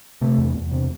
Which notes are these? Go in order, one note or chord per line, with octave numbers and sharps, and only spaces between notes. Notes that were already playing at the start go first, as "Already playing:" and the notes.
C3 A3
E2
E2
C3